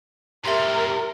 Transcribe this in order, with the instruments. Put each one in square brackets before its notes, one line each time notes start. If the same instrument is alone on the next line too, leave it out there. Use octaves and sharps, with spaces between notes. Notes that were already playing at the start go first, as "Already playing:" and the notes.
[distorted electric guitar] A2 C3 [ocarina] G4 [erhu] A#4 [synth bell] E5 C6